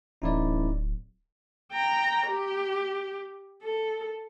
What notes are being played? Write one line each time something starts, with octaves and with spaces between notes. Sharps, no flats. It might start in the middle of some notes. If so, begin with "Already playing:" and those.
D1 A1 D#4 E4 D5
G5 A#5
G4
A4